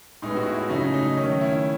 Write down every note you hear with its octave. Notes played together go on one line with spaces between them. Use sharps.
A2 G#3 B3 D#4
F#4
E4
C#3 F#3 A3 D#4
D#4
D#3 A3 C#4
E4